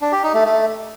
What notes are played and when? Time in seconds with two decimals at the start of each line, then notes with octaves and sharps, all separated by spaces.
0.01 D4
0.12 G4
0.23 D#4
0.34 A3
0.45 A3